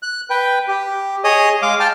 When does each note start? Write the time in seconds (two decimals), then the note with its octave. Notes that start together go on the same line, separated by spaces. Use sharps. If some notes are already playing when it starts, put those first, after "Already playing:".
0.03 F#6
0.30 B4 G5
0.68 G4
1.24 G#4 C#5 D#5 D#6
1.62 G#3 F5 D6
1.80 G5 A5 F6